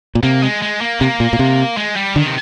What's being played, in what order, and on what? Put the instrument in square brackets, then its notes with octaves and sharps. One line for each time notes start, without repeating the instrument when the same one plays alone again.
[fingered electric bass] A#2
[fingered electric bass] C3 [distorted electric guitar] A#3
[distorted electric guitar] G#3
G#3
A#3
[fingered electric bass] C3 [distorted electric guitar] A#3
[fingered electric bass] A#2
A#2
C3
[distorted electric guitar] G#3
G3
[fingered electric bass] D3 [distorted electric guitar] D#3
[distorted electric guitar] C3